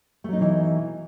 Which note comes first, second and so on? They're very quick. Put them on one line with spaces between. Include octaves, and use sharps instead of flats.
A3 F#3 D#4 B2 E3